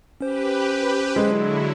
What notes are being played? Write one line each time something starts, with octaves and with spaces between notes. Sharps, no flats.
C#4 G4 B4 C5
D3 F#3 G#3 E4